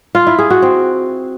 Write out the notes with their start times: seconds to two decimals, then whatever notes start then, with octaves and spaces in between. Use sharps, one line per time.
0.15 F4
0.27 E4
0.39 G#4
0.50 F#4
0.62 C4